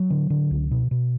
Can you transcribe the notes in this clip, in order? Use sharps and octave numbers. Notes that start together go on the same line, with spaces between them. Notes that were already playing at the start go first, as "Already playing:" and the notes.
Already playing: F#3
D3
D3
C#2
B2
B2